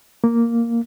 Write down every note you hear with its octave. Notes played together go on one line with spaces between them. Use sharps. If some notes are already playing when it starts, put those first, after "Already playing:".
A#3